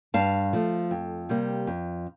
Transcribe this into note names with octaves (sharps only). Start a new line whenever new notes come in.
G2 F5 A5
F3 A3
F2
C3 G3 A#3
F2